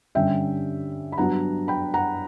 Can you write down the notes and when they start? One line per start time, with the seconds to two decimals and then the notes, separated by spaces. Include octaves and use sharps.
0.15 G2 D3 G3 C#4 E5 G5
1.12 B5
1.18 G2 F#3 B3 D4 F#5 A#5
1.68 G5 B5
1.94 F#5 A#5